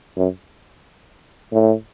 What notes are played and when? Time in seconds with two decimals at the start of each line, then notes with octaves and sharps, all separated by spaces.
0.17 F#2
1.53 A2